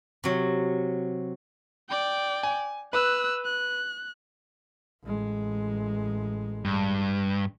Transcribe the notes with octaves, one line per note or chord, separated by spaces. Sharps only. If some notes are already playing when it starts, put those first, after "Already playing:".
C3 F#3
D5 G5
G#5
B4 E6 F#6
F#6
A1 G#3
G2